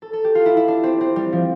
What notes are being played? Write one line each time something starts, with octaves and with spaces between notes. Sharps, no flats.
A4
A4
G4
F4
E4
E4
D4
C4
C4
G3
F3